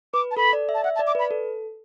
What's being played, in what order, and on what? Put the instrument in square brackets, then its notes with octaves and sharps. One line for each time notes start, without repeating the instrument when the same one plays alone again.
[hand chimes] B4 [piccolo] D6
[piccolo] A5
[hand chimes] A4 [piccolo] B5
[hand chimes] D5
E5
[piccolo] A5
[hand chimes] E5 [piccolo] F#5
[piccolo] A5
[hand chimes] D5
[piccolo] D6
[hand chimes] B4 [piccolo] B5
[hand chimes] A4